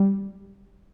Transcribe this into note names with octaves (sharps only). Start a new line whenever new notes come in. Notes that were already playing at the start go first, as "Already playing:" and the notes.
Already playing: G3